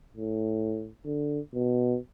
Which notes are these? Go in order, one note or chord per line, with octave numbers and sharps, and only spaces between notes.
A2
D3
B2